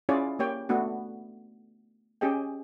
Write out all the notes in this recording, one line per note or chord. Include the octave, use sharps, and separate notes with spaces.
C#4 E4 F4 G#4 C#5 D5
A#3 G4 C#5 G5
A3 B3 D4 F#4
C#4 G4 G#4 D#5 G5